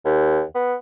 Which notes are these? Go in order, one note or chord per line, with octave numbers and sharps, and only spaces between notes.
D#2
B3